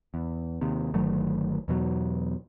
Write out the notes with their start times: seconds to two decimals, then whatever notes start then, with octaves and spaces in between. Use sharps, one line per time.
0.14 E2
0.61 D#2 C3
0.94 G1 D#3 F#3 A3
1.68 E2 B2 F#3